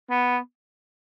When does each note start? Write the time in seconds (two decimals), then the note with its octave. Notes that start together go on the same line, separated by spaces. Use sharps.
0.10 B3